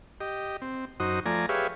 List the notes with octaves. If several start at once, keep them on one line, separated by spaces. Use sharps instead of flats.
G4 D#5
C4
F#2 D#4 F#4 C5 D#6
F3 A3 D5 G#5 A#5
G4 G#4 B4 C#5 E5 F5